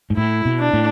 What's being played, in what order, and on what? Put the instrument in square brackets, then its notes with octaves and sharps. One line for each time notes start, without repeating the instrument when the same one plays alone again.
[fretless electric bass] G#2
[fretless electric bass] A2 [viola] E4
[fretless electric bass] B2
[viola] D4
[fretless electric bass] A2